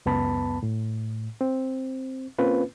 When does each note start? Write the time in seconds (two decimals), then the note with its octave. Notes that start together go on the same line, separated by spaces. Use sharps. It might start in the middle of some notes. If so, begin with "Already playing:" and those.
0.06 C#2 F#2 B3 A5 B5
0.63 A2
1.41 C4
2.39 A#3 C4 C#4 F4 B4